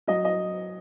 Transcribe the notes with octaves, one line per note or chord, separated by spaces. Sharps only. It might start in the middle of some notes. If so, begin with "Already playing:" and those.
F#3 D#5
D#5